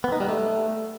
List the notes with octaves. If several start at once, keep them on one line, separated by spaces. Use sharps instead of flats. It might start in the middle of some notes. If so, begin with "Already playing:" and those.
B3
D#4
G3
A3